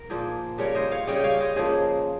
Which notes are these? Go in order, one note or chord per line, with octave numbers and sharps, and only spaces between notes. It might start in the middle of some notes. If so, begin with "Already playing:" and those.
Already playing: A#4
A#2 F3 A#3 G#4 C5
C#3 G3 C#4 A#4 C#5
C5 D#5
C#5 F5
C#3 G3 C#4 D#5 G5
C#5 F5 G5
C5 D#5
C#3 F3 A#3 G#4 C5